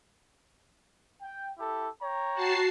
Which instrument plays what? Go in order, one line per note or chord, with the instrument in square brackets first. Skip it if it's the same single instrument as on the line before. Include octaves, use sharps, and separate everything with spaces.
[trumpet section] G5
E4 G4 A4
C#5 G5 A#5
[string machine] F#4 A5 C7